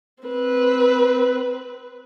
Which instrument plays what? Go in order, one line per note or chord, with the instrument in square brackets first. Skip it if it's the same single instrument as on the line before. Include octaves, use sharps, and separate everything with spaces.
[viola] C4 B4